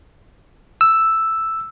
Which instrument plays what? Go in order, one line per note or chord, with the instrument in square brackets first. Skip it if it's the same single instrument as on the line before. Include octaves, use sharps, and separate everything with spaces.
[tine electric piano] E6